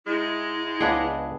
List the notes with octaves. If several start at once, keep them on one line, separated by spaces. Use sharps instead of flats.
G#2 G#3 E4
C#2 B3 D4 G#4 F#5 G5